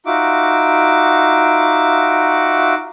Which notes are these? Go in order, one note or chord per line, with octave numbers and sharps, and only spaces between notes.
D#4 F4 F#4 E5 D6